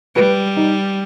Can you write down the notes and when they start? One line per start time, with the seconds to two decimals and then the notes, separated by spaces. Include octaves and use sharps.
0.16 G3 B4
0.57 D#4